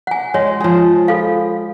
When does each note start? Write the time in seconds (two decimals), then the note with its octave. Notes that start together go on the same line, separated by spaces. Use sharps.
0.07 F#5 G#5
0.34 G#3 C#5
0.60 F3 G#4
1.08 F4 A4 F5